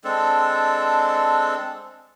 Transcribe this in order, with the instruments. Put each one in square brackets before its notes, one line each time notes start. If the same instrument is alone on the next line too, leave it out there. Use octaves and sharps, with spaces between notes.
[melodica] G#3 C4 D4 A4